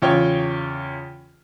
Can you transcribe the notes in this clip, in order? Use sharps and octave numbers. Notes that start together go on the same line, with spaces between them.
E2 C#3 F4 C#5 G5